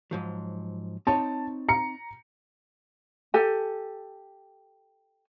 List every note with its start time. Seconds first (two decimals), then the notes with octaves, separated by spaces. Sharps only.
0.11 G#2 F3 F#3
1.07 C4 D#4 C#5 A5
1.69 A#5 C#7
3.34 G4 A4 G#5